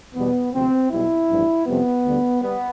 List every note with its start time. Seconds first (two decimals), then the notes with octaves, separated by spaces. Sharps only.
0.15 E2 B2 G3 B3
0.53 D2 C3 F3 C4
0.90 B1 B2 G3 E4
1.29 A1 G2 F3
1.66 F2 C3 G3 B3
2.04 D2 D3 G3
2.42 G3 B3